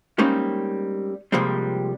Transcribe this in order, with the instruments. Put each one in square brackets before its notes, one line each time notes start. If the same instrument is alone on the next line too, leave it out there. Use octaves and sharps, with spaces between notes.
[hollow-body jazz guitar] G3 G#3 A#3 C4 C#4 D#4
C3 F3 G3 G#3 A#3 C4